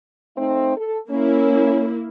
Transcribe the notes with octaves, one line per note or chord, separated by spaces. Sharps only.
A3 C4 D#4
A4
A#3 C#4 E4